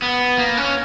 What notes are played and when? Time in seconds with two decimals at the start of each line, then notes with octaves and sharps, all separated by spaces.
0.02 B3
0.38 A#3
0.57 C#4